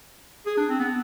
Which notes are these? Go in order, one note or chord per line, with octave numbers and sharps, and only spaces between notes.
G#4
D4
C4
B3